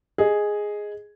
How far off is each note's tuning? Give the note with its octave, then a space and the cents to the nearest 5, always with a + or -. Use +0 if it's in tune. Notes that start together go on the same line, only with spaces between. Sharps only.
G#4 +0 D#5 +0